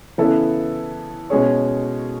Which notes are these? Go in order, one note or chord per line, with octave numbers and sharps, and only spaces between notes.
C#3 E3 B3 E4 A4
B2 G#3 C#4 G#4 C#5